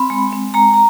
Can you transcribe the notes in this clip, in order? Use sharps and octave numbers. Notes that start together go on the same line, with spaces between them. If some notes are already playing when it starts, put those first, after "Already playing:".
Already playing: C4 B5
G#3
C4
G#3 A#5
A#5